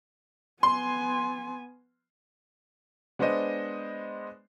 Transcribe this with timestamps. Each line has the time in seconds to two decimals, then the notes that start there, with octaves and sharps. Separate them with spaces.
0.63 B3 G#5 C6
3.19 G#3 B3 D4 C5 D#5